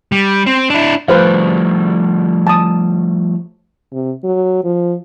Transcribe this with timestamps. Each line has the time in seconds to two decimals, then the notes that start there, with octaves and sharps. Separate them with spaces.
0.12 G3
0.46 C4
0.70 D4 E4
1.08 F3 G3 A3 B4 C5 F5
2.47 A5 D#6
3.92 C3
4.24 F#3
4.64 F3